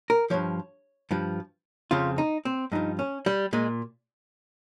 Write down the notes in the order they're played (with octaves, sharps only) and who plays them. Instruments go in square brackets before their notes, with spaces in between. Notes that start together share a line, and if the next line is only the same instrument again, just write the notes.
[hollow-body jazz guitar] A#4
G2 F3 C#5
G2 F3
F2 C#3 F3 F4
D#4
C4
G2 F3 D#4
C#4
G3
A#2 G#3